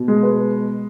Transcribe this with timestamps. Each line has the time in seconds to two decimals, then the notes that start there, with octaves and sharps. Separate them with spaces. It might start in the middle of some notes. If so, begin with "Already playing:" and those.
Already playing: B2
0.08 G#3
0.23 B4